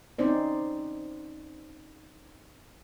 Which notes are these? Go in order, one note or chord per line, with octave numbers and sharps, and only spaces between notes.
C4 C#4 D#4 C5 D5